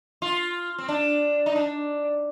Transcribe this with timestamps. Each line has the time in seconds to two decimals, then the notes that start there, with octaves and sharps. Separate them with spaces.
0.22 F4
0.78 C4
0.88 D4
1.46 D#4
1.56 D4